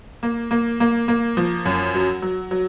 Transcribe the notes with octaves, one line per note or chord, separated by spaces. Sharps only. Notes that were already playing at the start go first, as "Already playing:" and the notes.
A#3
A#3
A#3
A#3
F3
F#2
F#3
F#3
F#3